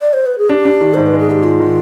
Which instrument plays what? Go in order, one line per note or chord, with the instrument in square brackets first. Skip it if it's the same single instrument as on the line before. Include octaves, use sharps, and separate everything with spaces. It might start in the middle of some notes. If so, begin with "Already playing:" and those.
[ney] D5
C5
B4
G#4
[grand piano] D4 [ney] G4
[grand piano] D4
D#3
[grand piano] G#2 [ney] C5
[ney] B4
[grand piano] G#3
[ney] G#4
[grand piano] G#2 [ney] G4
[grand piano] G#3 [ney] F4
[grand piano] D#3